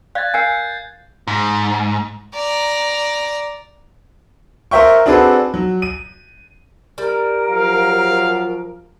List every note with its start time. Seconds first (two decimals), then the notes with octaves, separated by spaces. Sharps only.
0.15 D5 F5 F#6 G#6 A6
0.34 A#4 F5 G#5 G6 C7 C#7
1.27 G#2
2.35 D5 A#5
4.71 A#4 C5 E5 G5 C#6
5.06 C4 D4 F#4 G#4 A4 B4
5.54 F#3
5.82 D#7
6.98 G3 A#4
7.50 F3 F#3 F5